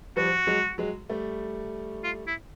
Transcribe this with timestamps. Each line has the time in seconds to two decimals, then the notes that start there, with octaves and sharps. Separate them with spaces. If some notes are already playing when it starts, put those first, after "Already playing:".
0.16 F3 G3 F#4
0.47 F#3 G#3
0.78 F#3 G#3
1.09 G3 A3
2.03 F4
2.27 E4